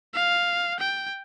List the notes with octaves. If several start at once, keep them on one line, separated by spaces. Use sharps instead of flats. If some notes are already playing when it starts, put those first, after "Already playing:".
F5
G5